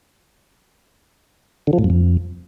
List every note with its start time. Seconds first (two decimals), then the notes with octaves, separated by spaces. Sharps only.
1.67 D3
1.73 F3
1.79 A2
1.84 F#2
1.90 F2